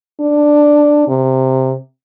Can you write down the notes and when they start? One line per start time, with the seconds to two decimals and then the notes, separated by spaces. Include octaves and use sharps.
0.20 D4
1.08 C3